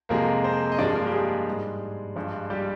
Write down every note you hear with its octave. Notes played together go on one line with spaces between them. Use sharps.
F2 C3 F3 G#3 A#3 A#4
C4 C5
D#5
G2 F3 G#3 D4 D5
A#3 A#4
G4
G#3 G#4
G#2 G3
G2 F3 G#3
G3 G4